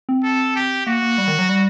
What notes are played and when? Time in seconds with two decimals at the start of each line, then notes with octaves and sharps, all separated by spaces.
0.09 C4
0.23 A4
0.56 G4
0.87 A#3 F#4
1.02 A#3
1.18 G3
1.28 D#3
1.38 F#3
1.49 G3